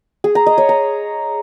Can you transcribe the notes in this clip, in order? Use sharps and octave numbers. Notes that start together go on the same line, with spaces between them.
G#4
A#5
D#5
C#5
A#5